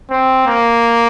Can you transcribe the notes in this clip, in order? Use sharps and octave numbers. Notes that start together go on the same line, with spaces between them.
C4
A#3